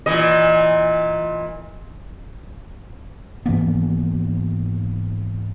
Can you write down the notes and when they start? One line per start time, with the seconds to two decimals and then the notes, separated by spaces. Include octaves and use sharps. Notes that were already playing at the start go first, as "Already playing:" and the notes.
0.06 A#2 E3 D#5
3.46 G#2 E3 A#3 B3